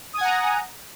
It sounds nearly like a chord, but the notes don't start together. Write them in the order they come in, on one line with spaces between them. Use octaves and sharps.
D#6 G#5 F#5 A#5